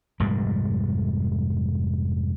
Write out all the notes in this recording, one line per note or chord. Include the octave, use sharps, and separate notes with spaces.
F1 G#2 G3